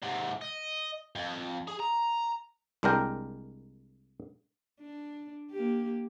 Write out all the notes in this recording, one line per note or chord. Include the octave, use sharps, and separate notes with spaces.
G#2 C3
D#5
F2
G#4
A#5
C2 G#3 D4 A#4 G5
D4
A#3 G4